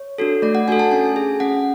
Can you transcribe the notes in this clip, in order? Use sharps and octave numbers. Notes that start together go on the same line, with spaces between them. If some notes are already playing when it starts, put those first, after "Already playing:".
Already playing: C#5
D4 F#4 A4
A3 D5
F#5
D4 F#4 A4 G#5
A5
C#4 G#5
G#4
C#4 F#5